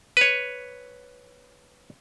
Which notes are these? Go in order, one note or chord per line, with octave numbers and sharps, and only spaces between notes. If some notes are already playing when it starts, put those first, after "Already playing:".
B4 C#5